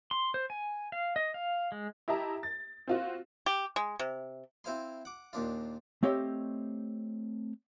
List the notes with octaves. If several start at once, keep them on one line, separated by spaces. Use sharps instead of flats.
C6
C5
G#5
F5
D#5
F5
G#3
E4 G4 D#5 E5 A5 A#5
A6
C4 F4 F#4
G4
G#3
C3
C4 E4 C5 F5 G#5 C6
F#5 D6
D#2 A#2 D4 F4
A3 C4 G4 C#5 D#5 E5